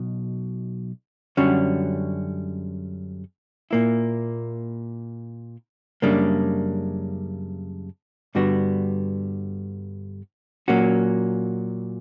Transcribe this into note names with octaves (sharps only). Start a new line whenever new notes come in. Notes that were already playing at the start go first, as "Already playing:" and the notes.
Already playing: B1 B2
F#2 D3 G3 C#4 F#4
A#2 A#3 E4
F#2 C#3 G3 A#3 D4
G2 D3 G3 B3 F#4
A#2 F#3 A#3 C#4 F#4